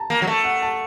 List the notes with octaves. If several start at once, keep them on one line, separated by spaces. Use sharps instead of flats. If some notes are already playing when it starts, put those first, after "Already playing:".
Already playing: A5 A#5
A#3
F#3
A3
F#5
A5